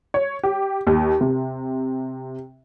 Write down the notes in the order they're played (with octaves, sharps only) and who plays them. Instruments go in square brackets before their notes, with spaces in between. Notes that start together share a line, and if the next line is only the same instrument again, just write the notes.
[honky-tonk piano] C#5
G4
D#2
C3